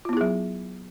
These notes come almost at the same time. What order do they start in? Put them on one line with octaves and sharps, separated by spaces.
F4 B3 E4 G#4 F#3